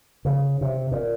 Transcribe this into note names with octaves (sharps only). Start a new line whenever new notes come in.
C#3
C3
A#2